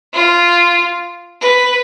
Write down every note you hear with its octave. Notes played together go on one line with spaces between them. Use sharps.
F4
B4